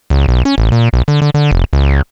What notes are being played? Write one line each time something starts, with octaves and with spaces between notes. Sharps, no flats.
C#2
B1
C#4
A1
A#2
B1
D3
D3
D3
F1
C#2